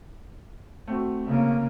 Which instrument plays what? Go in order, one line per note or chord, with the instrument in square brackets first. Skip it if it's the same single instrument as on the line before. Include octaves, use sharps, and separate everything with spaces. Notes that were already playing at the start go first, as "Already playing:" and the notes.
[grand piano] A3 C4 F#4
[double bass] C#3 A#3